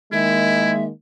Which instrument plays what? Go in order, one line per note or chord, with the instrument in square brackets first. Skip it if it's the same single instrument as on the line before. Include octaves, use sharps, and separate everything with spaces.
[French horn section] D#3 G#3 A#3 [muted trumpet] E4 [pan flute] E5